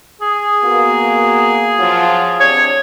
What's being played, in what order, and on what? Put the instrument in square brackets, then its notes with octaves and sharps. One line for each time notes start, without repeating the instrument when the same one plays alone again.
[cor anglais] G#4
[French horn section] A#3 B3 F#4
F3 F#3 F4
[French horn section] C3 D4 [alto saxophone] C#5